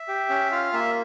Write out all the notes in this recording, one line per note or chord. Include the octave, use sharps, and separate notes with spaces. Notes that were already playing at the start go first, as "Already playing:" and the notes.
Already playing: E5
G4
C#4
F4 F5
A#3 E5